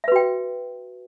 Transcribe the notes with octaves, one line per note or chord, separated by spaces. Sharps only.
F#4 B4 E5 G5